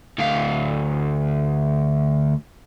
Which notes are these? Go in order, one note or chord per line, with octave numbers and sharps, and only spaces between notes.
D2 F5